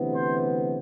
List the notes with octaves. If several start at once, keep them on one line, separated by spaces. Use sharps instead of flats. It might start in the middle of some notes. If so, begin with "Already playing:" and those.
Already playing: D2 C3 E3 B3
C5